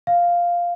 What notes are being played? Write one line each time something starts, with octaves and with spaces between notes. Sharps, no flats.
F5